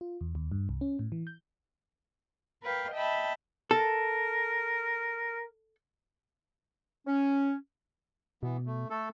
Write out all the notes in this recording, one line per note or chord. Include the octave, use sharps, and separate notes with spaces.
F4
E2
D#2
G2
C2
C#4
A2
E3
G6
A#4 B4 F5 G5
D#5 E5 G5 A5 B5
A4 A#4
C#4
B2 E3 B3
A3
A3 A4